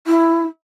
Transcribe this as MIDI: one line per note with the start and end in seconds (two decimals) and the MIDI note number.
0.07 0.44 64